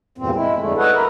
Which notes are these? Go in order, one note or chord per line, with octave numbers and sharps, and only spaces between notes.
E2 G2 A#2 C4
G#3 E4
F2 G#2 D3 A3
F#4 A4 B4 C#5 D#5 F#5
A#4 B4